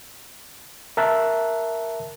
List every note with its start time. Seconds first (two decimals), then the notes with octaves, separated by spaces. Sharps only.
0.97 A#4 E5 A5 F#6